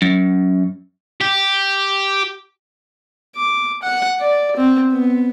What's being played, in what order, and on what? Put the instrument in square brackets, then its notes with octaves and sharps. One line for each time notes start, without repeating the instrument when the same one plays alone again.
[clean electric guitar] F#2
[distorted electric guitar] G4
[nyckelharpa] D6
F#5
D5
C4
B3